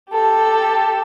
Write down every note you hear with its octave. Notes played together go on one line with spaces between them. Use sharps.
G4 A4